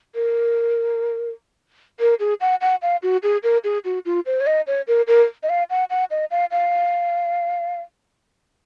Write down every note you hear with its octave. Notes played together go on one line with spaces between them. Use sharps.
A#4
A#4
G#4
F#5
F#5
F5
F#4
G#4
A#4
G#4
F#4
F4
C5
C#5
D#5
C#5
A#4
A#4
D#5
F5
F#5
F#5
D#5
F5
F5